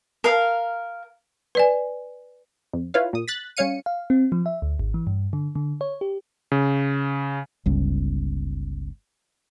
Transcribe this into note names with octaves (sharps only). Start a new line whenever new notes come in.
A#4 F5
B4 D5 G#5
F2
E4 F4 B4 C#5 F5
A#2 D#6
F#6 A6 B6
G3 C#4 C#5 F5 C#7 D#7
F5
C4
F3
E5
D2
G#1
E3
G2
D3
D3
C#5
G4
C#3
G1 C#2